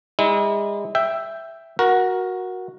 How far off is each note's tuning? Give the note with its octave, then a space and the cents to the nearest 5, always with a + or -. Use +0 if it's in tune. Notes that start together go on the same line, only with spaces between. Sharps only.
G#3 -40 E4 -40
E5 +5 G5 +0
F#4 -5 A#4 +15